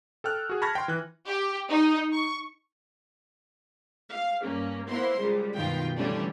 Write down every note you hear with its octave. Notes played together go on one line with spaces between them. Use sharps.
A4 G5 F6 F#6
F#4 G#4
A5 B5 C#6 F6 G#6 A#6
G5 C6
E3 F#6
G4
D#4
C#6
F5
G2 A#3 C#4
A#3 B3 E4 A#4 C5 C6
C#2 G3 G#3
F#2 B2 D#3 F4 G5
D3 E3 G3 A3 C#4 D4